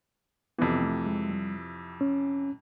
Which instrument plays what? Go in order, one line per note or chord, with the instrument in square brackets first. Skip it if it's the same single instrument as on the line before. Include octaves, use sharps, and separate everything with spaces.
[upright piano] F2 C3 E3 [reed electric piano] B3
[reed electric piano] A3
G#3
G3
C#4